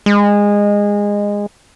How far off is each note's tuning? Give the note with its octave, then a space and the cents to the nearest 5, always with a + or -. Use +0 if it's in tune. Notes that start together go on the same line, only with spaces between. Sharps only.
G#3 -20